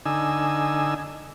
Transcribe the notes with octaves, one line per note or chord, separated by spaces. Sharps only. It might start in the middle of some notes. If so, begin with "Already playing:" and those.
D3 D#4 G#5 E6